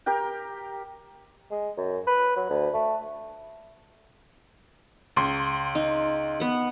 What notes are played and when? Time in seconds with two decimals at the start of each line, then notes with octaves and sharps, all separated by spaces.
0.06 G4 A#4 G5
1.51 G#3
1.77 F#2
2.07 B4
2.36 F#3
2.50 D2
2.74 A3
5.16 C#2 C6
5.75 D#4
6.40 B3 F#5